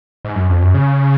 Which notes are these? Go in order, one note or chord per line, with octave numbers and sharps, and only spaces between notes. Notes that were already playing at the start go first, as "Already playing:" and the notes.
G#2
F#2
F2
F#2
C#3